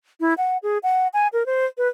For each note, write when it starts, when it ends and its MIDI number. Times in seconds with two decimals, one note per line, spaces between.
0.20 0.34 64
0.38 0.57 78
0.63 0.78 68
0.83 1.08 78
1.14 1.28 80
1.33 1.46 70
1.46 1.65 72
1.78 1.88 71